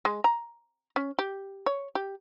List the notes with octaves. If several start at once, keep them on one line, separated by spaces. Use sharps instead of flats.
G#3
A#5
C#4
G4
C#5
G4